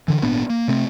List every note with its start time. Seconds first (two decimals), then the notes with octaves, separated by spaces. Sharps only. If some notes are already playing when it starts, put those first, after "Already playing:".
0.08 D3 E3
0.22 G#1 A#2 B3 D4
0.50 A#3
0.68 C3 A3 C4